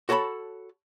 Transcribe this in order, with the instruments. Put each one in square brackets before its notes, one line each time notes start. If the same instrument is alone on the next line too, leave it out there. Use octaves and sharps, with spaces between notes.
[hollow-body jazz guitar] F#4 A4 C#5 A5 B5